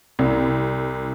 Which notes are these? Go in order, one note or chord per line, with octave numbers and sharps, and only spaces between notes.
C2